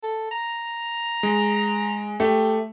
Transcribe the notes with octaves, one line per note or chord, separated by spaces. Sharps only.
A4
A#5
G#3
A3 G4